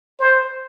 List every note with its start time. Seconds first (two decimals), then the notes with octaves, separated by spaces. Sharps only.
0.20 C5